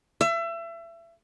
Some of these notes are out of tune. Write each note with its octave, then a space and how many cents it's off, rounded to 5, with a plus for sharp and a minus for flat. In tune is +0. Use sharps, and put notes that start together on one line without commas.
E5 +30